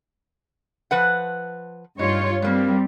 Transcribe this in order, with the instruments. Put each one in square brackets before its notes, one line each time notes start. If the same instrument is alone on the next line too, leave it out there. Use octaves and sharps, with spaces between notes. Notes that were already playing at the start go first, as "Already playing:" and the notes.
[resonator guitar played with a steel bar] F3 B4 F#5
[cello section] G2 F4 C#5 [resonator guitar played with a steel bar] D#4
[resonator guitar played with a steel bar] G2 A#3 [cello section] G3 C4